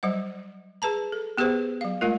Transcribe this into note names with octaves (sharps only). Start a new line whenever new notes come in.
F#3 G3 C5 F#5
G#4 B4 A5 A#5
A4
B3 G4 G#4 B4 C5
F#3 F5
G#3 A3 F4 A#4